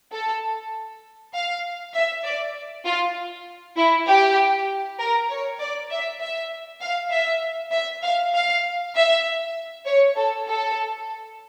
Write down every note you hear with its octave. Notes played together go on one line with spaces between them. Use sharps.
A4
F5
E5
D5
F4
E4
G4
A#4
C#5
D5
E5
E5
F5
E5
E5
F5
F5
E5
C#5
A4
A4